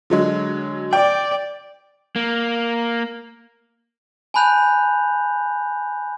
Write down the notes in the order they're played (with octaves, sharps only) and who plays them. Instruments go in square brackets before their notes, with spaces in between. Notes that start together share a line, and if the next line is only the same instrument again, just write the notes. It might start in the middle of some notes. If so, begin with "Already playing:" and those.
[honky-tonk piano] D3 F#3 G#3
[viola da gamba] D5 [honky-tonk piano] G5
[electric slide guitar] A#3
[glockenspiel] G#5 A5 B5 F#6 G6 F7